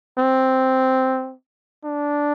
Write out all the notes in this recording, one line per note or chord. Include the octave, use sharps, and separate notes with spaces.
C4
D4